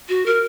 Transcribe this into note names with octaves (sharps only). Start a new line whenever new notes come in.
F#4
A#4